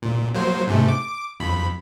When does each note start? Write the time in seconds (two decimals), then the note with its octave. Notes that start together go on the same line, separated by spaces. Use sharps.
0.02 A#2
0.35 F#3 A#3 C5
0.67 G#2 C3 A3
0.89 D6
1.40 F2 B5